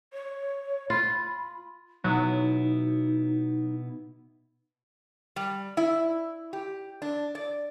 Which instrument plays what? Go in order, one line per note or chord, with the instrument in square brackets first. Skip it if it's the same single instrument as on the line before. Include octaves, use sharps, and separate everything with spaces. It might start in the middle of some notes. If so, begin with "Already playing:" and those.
[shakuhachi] C#5
[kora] F4 [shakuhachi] B5
[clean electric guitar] B2 B3 E4 [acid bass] F#3 [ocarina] D#4
[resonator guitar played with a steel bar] G3
E4
G4
D4
D5